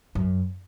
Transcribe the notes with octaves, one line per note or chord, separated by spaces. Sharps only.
F#2